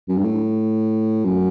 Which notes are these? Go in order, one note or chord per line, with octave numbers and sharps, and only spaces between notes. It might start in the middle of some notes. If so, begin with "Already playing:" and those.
F#2
G2
A2
F#2